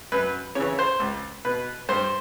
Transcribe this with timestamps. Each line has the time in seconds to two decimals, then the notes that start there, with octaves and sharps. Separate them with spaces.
0.12 F#2 B4
0.55 C#3 E3 C#5
0.79 C5
1.00 C#2
1.45 B2 B4
1.89 G2 C5